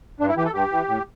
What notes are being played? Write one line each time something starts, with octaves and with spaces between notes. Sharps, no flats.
G2 D4
E4
E3 G4
A4
G2 G4
E3
A2